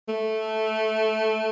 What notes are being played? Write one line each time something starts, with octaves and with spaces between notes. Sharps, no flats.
A3